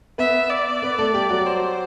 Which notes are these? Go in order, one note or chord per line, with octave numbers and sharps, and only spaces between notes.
B3 B4 E5
D5
B3 B4
A3 A4
G3 G4
F#3 F#4
C5